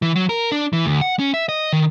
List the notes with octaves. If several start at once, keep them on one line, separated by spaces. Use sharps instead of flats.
E3
F#3
A#4
D4
E3
D2
F#5
C#4
E5
D#5
D#3